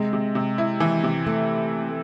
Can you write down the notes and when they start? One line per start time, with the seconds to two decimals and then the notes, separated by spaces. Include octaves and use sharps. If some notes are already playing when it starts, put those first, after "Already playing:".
Already playing: C3 G#3
0.13 C3
0.35 C3
0.58 E4
0.80 E3
1.04 C3
1.27 A3